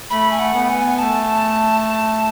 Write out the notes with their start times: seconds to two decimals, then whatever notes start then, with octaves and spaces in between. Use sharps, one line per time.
0.10 A3 B5
0.31 G#5
0.39 F#5
0.54 B3
0.69 G#5
0.98 A3 A5